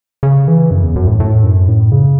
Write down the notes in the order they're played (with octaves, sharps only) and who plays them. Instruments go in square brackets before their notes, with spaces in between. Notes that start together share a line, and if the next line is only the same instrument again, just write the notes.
[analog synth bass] C#3
E3
F#2
E2
F#2
A2
A2
F#2
A2
C#3